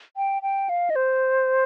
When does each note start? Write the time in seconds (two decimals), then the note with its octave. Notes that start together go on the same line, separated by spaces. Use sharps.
0.17 G5
0.42 G5
0.69 F5
0.90 D#5
0.96 C5